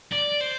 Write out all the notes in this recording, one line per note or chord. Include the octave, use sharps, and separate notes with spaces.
D5
C5